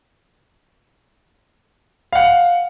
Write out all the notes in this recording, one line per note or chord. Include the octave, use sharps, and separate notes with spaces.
F5 F#5